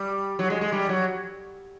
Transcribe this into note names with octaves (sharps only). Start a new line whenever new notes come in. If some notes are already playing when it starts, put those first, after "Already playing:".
Already playing: G3
F#3
G#3
G#3
G3
F#3